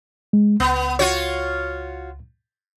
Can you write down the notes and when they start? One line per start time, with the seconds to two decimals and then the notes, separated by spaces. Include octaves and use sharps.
0.33 G#3
0.60 C#2 B3
0.99 F4 F#4 C#5